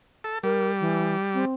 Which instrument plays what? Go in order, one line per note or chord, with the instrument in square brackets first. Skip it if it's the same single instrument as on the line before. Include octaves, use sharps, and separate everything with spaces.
[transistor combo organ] A4
[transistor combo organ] G3 [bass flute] A#4
[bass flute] E3
C4